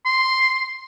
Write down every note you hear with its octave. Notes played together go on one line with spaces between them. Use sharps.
C6